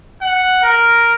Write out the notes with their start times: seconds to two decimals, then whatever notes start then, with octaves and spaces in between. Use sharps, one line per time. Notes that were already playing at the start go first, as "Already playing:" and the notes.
0.22 F#5
0.63 A#4